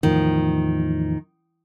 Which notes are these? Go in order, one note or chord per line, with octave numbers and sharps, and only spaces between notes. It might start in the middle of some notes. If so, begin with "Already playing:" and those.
E2 A2 D#3 F3